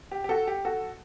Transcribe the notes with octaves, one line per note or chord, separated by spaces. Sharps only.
G4
G4
F#4 A4
G4
F#4 A4